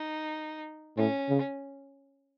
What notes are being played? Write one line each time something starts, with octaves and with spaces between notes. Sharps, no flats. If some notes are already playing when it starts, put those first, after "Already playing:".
Already playing: D#4
A2 C#4
C#3